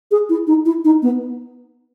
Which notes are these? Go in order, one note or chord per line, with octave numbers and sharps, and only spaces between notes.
G#4
E4
D#4
E4
D#4
B3